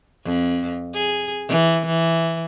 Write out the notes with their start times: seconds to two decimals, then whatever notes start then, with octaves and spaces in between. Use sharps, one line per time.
0.24 F2
0.94 G#4
1.49 E3
1.86 E3